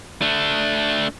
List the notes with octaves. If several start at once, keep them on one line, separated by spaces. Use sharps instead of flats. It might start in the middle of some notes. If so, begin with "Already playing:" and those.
A3 D4